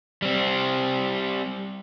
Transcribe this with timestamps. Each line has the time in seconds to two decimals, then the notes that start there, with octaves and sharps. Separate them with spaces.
0.22 G3 C4